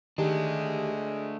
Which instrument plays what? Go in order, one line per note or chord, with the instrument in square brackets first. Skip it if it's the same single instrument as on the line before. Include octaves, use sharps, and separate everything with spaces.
[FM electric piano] D#3 G4 [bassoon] G#3 [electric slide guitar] A3 D4